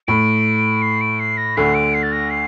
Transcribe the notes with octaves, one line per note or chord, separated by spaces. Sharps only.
A2 D7
C7
D7
C7
A#6
D2 D3 C7
D7
C7
A6
A#6
C7